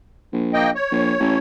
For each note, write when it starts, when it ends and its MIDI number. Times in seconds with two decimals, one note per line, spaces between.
0.33 0.72 34
0.53 0.71 58
0.53 0.71 75
0.53 0.71 79
0.75 1.39 73
0.91 1.14 34
1.20 1.37 33